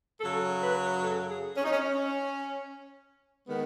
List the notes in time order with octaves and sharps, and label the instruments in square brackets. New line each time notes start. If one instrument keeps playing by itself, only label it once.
[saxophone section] F#2 C#3 F#3 A4
B4
A4
G#4
C#4
D#4
C#4
C#4
D#3 G#3 B3